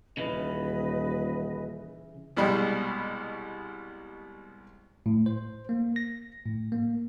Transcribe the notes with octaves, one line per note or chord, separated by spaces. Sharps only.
D#1 C#3 E3 B4 D#5
C2 B2 G3 G#3
A2
C5
A#3
A#6
A2
A#3